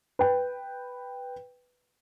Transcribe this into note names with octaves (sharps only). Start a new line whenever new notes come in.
B4 G5